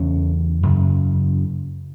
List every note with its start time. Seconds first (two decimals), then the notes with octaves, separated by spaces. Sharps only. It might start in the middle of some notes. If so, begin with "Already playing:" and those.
Already playing: E2 C#3 C#4
0.63 F#2 C#3